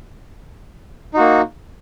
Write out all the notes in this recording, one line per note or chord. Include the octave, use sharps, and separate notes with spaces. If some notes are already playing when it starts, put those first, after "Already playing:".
A#3 D#4 F#4